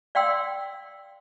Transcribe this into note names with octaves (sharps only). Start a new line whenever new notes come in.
D5 F5 G5 C6 E6